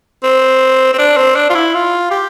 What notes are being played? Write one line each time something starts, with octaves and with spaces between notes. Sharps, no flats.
C4
C4
D4
C4
D4
F4
E4
F4
G4